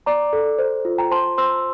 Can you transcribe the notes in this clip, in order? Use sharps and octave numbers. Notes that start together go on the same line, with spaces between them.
D5 A#5 D6
A4
C5
F4
G5 A#5
C5 A5 C6
C5 C6 E6